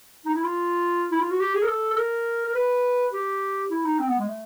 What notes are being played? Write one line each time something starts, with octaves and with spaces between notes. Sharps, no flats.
D#4
E4
F4
E4
F4
F#4
G4
G#4
A#4
A4
A4
A#4
A#4
B4
G4
E4
D#4
C4
B3
G#3
A3